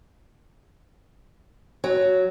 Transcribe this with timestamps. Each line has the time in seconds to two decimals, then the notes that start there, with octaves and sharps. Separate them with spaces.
1.84 F#3